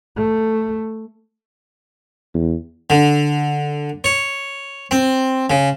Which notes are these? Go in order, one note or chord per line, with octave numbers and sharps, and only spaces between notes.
A3
E2
D3
C#5
C4
C#3